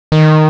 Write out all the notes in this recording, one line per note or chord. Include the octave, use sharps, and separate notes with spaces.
D#3